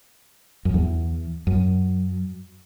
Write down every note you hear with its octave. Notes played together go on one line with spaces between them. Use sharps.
F#2
E2
F#2